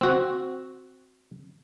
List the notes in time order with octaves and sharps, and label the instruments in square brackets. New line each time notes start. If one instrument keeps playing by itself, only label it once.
[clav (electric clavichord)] C4 F#4